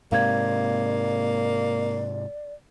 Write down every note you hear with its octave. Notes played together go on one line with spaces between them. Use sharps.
G#2 C3 A#3 D5 F5 G#6